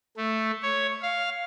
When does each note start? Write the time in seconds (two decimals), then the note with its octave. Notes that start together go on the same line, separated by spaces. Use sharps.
0.17 A3
0.62 C#5
1.02 F5